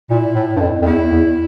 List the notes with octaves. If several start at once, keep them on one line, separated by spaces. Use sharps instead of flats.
A#2 E4
A2
G2
F2
F2
E2 E4
E2